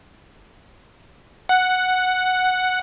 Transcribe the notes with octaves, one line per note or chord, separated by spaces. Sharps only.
F#5